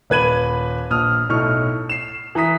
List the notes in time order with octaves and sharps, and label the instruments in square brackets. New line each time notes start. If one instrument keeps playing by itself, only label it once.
[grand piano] D#1 B4 G#6 D#7 F#7
A#1 D#6 F6
B1 A2 C#6 F6
C7 E7
E3 A#5 D#6 B6